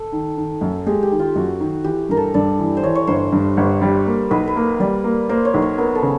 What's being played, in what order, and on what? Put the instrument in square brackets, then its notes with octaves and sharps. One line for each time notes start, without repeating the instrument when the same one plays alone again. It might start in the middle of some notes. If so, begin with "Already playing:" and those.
Already playing: [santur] A4
[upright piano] D#3
D#3
F#2
[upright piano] G#3 [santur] G4
[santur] G4
[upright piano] D#3
[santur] F4
[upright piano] F#2 [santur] F#4
[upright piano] D#3
[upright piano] E3 [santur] G4
[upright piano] G2 [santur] A#4
[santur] A4
[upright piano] G2 [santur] D5
[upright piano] E3
[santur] C5
[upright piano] E3 [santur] C#5
[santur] C#5
[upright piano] G1 [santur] C5
[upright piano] G2
G1
G3
A#3
[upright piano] B1 [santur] B4
[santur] B4
[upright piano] A#3
[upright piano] G3 [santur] D5
[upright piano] A#3
[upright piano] A#3 [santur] C5
[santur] C#5
[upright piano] B1
[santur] C#5
[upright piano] B3 [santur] A#4
[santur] A4
[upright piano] C#3